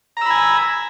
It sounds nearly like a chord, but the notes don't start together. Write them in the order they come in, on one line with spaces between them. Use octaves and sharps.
A#5 E6 B5 G#5